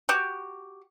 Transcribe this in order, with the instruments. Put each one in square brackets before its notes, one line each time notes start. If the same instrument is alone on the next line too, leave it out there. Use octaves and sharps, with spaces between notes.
[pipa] F#4 G4